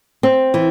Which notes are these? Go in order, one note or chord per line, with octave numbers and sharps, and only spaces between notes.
C4
E3